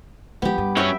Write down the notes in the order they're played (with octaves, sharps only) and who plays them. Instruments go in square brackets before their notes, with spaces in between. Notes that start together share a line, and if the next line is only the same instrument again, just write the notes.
[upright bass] F3 G#3 [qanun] B3 G4
[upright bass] G2
[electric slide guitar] F#3 C#4 C#5 [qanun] E5 G5